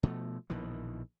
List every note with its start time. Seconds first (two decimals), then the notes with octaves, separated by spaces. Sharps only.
0.03 B2 F3 A3
0.50 A#1 B2 D#3 E3